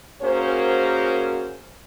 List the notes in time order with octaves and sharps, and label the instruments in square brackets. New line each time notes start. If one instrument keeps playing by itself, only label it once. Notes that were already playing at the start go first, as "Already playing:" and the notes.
[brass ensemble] A#3 C#4 F#4 G#4 A#4 C5